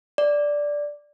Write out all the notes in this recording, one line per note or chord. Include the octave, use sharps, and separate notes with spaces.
D5